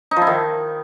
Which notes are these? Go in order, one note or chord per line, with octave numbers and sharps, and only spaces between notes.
D#4
F3
E4
D#3